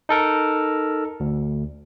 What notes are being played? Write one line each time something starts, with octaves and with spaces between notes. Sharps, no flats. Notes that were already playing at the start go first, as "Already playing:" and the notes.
D#4 A4 A#4
D2